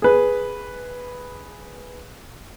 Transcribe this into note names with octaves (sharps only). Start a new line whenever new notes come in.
G#4 B4